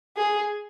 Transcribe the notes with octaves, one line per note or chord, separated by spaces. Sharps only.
G#4